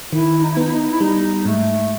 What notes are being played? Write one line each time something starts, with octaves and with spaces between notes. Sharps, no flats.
D#3 E4
D#4
E4
B3 D#4
E4
D#4
E4
G3 D#4
G#2 A3